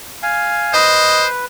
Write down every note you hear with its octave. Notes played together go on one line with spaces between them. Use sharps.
F5 G#5
B4 C5 D#5